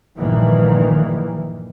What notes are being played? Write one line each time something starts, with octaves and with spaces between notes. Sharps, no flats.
A#1 G2 D#3 E3 A#3